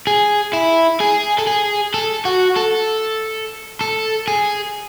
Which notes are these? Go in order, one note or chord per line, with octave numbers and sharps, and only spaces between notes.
G#4
E4
G#4
A4
G#4
A4
F#4
A4
A4
G#4